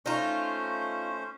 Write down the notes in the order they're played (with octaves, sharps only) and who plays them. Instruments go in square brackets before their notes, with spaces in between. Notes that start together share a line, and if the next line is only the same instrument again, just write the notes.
[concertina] A3 C#4 C5 [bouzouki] D#4 F4